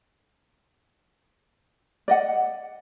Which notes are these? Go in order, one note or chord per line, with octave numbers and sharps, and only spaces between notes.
D5 D#5 F#5